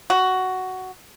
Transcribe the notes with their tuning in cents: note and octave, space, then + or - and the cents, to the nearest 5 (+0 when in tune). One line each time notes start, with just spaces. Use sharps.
F#4 +10